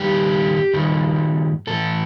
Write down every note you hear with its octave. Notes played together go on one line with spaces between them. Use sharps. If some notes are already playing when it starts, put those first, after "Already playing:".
Already playing: G2 D#3 G3 G4
G2 D#3 G3
A2 E3 A3 A4